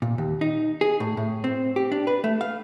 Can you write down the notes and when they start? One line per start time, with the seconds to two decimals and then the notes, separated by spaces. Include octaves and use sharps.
0.02 A#2
0.18 D#2
0.41 D#4
0.81 G#4
1.00 A2
1.17 A2
1.44 C4
1.76 G4
1.92 D4
2.07 B4
2.24 A3
2.41 F5